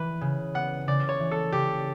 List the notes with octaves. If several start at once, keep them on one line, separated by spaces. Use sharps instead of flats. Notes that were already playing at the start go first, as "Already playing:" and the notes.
Already playing: E3 B4
C#3
B3 F#5
C#3 D5
C#5
E3
A4
C#3 G4